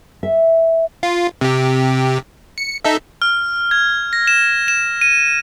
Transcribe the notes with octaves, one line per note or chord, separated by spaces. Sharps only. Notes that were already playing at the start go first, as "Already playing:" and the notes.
E5
F4
C3 G4
C#7
D#4 A4 E5
F6
G#6
A#6
E7
E7
D#7